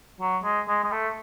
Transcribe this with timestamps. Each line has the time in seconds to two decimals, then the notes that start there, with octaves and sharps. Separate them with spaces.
0.21 F#3
0.44 G#3
0.68 G#3
0.84 G#3
0.92 A3